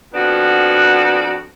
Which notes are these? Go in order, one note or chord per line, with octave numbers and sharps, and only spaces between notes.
F2 B3 D4 F#4